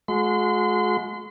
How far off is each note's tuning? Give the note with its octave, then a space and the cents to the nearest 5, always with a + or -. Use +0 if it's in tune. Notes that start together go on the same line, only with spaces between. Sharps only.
G#3 +40 F#4 -35 C6 -35